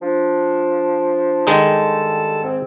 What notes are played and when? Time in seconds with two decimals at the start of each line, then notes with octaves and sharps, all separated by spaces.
0.01 F3 D4
1.47 G2 D#3 G#3 D#4 A4 A5
2.43 G#2 C4